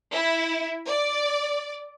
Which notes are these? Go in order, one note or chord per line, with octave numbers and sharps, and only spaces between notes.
E4
D5